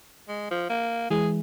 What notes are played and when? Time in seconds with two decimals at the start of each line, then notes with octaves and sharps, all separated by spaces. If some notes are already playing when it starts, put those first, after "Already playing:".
0.29 G#3
0.51 F3
0.70 A#3
1.10 E3 G#3 G#4